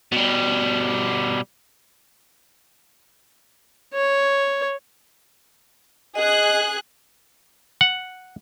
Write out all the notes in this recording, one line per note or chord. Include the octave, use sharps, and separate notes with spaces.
B2 G3
C#5
G#4 D#5 F#6
F#5